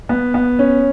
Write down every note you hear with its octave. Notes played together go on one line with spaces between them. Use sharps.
B3
B3
C#4